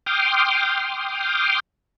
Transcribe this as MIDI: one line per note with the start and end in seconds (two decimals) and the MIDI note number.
0.06 1.60 79
0.06 1.60 84
0.06 1.60 86
0.06 1.60 87
0.06 1.60 89